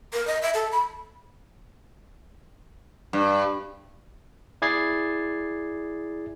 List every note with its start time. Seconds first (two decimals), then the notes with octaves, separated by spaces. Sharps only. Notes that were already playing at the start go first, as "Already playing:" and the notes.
0.13 A#4
0.27 D#5
0.42 E5
0.54 A4
0.72 B5
3.13 G2
4.62 E4 G#4 D5 G#6 A6 C7